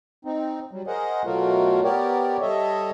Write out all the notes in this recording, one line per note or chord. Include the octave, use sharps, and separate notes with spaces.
C4 D#4
F#3 G3
G#4 A#4 C5 D#5 F#5
B2 F#3 A3 F4 F#4 A#4
B3 G4 A#4 C#5 D5
G3 A4 C#5 D#5 E5